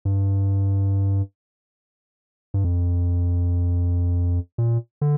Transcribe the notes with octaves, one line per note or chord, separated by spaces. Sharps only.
G2
G2
F2
A#2
D3